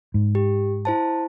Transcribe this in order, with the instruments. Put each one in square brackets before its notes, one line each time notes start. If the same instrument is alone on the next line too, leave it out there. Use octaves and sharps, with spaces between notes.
[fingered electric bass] G#2
[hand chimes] G4
E4 C5 A5